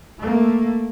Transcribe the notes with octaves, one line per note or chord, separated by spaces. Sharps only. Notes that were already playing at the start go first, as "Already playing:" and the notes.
A3 A#3